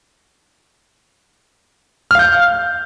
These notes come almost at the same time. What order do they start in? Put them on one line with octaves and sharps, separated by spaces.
F6 F5 G6